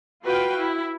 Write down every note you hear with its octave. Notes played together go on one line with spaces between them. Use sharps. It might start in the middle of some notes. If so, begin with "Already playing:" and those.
F4 F#4 B4 F5 G5
E4